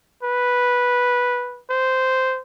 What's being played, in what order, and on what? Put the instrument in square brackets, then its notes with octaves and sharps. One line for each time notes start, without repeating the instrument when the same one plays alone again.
[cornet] B4
C5